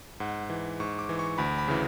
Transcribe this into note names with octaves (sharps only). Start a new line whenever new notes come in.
G#2 F#5
E3
G#2 C#6
D6
E3
C#6
D2 B5
B5
C#3 E3